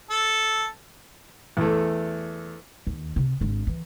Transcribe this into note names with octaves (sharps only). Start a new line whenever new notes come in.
A4
E2 A3
D#2
C3
G#1 D4
E3